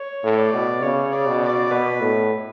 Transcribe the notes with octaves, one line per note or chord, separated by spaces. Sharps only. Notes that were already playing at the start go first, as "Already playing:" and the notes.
Already playing: C#5
A2
D5
B2
C#3 C#5
D5
B2
D5
B2 B4
A2